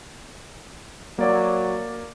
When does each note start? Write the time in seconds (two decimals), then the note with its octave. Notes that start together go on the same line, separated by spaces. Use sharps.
1.19 F#3 A#3 D5